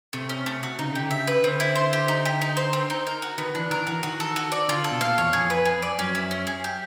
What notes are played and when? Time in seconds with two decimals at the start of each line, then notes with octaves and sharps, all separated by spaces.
0.13 C3 A3
0.29 C#4
0.46 A3
0.63 F#4
0.79 C#3 D#4
0.92 D3 G4
1.06 C#3
1.11 E5
1.27 B4
1.43 D3 C4
1.60 E4
1.75 C5
1.93 G4
2.08 D#4
2.25 G4
2.42 D#4
2.57 C5
2.73 C4
2.90 D#4
3.07 A#4
3.22 F#4
3.38 D#3 B3
3.55 E3 D4
3.70 D#3 A#4
3.87 E3 F#4
4.03 D#3 F#4
4.20 A4
4.36 F#4
4.52 D5
4.68 D3 F4
4.84 A4
4.91 B2
5.01 A#2 F5
5.18 E2 C#5
5.33 F2 G#4
5.50 B4
5.65 G#4
5.82 D5
5.99 F#2 C#4
6.15 E4
6.31 C#4
6.47 G#4
6.64 G4